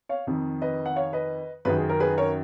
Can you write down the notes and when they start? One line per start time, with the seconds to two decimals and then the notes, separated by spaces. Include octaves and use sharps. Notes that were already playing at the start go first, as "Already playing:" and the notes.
0.09 C#5 F5
0.27 F2 D#3
0.62 B4 D#5
0.86 F#5
0.96 C#5 F5
1.13 B4 D#5
1.65 F#2 G#4 B4
1.69 D#3
1.78 G#4
1.89 A#4
2.00 G#4 B4
2.17 A#4 C#5